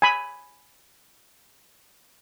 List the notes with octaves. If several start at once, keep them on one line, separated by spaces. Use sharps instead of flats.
G#5 B5